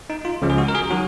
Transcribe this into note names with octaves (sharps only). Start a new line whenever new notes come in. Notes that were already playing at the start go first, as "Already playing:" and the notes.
D#4
F4
C#2 C#3 F3 G#3
G#4
F#4
A#4
G#4
D#3 F#3 F#4